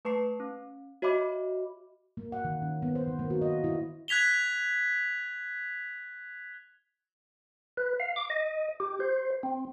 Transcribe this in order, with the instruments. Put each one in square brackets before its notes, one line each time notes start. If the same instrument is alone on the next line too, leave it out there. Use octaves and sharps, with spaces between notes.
[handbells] A3 B4 A5 C#6 C7
C#4
F#4 C#5 D#5 E5 B5 D6
[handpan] A#3
F#5
D#3
C#4
B3
C5
D#3
A#3
F#4
D#5
E4
[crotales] F#6 G#6 B6 F7 G7
[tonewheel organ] B4
F5
D6
D#5
G4
C5
C4